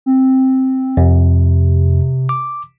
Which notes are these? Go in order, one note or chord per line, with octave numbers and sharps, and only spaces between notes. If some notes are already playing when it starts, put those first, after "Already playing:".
C4
F2 C3
D6